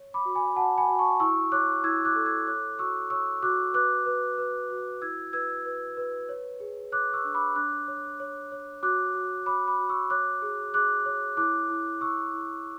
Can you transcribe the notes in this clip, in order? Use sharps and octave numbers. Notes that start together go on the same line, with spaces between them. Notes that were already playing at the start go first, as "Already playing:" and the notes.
Already playing: C#5
B5 D6
F#4
G#5 B5
F#4 F#5 A5
G#5 B5
F#4
A5 C#6
E4 C#6 E6
C#5 D6 F#6
E4 E6 G#6
D6 F#6
A4
E6 G#6
C#5 D6 F#6
F#4 C#6 E6
C#5 C#6 E6
F#4 D6 F#6
B4 D6 F#6
B4
B4
F#4
E4 E6 G#6
B4 E6 G#6
B4
B4
C#5
G#4
C#5 D6 F#6
C#6 E6
D4
B5 D6
D4 D6 F#6
C#5
C#5
C#5
F#4 D6 F#6
F#4
C#5 B5 D6
B5 D6
F#4
C#6 E6
C#5 D6 F#6
G#4
G#4 D6 F#6
C#5
E4 D6 F#6
E4
E4 C#6 E6
E4